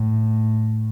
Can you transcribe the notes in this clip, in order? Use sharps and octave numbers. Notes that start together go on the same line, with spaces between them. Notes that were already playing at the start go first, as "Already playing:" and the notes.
Already playing: A2